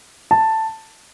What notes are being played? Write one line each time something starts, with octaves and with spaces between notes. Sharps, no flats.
A5